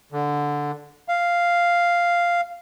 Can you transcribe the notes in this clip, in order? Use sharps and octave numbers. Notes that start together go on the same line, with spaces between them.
D3
F5